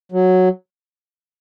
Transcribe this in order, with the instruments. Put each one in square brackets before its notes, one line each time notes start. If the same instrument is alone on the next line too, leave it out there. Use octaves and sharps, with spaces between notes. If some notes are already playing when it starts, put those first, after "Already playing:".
[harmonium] F#3